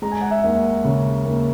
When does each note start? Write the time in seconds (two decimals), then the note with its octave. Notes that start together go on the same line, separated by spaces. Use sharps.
0.02 G#3 A#5
0.12 G#5
0.21 F#5
0.31 E5 G#5
0.44 D#2
0.84 C#3
1.25 D#2